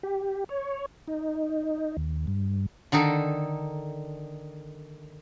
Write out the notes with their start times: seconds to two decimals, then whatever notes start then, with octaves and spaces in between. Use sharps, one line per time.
0.03 G4
0.49 C#5
1.08 D#4
1.97 D#2
2.27 G2
2.92 D3 D#3 D#4 A4